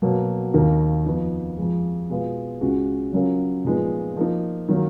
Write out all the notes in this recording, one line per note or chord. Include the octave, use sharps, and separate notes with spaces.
B2 F#3 A#3
D#2 D#3 A#3 D#4 A#4
F2 F3 B3 D#4
F2 F3 G#3
B2 G#3 B3 F4
C#2 C#3 G#3 C#4 F#4
C#3 F#3 C#4 F4 A#4
A#2 F3 G#3 B3 D#4
F3 A#3 D#4
D#3 F#3 A#3